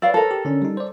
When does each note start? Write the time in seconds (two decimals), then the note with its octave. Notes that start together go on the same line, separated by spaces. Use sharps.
0.02 B4 C#5 D5 F5 E6
0.14 A4 A#4
0.31 G4
0.45 D3 C#4 D4
0.62 G3 D#4
0.77 C5 D5